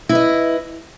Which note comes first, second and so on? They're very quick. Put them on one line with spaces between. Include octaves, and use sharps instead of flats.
E4 B4 D#5